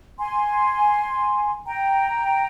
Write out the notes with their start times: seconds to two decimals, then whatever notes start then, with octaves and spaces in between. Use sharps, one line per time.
0.19 G#5 C6
1.66 G5 A#5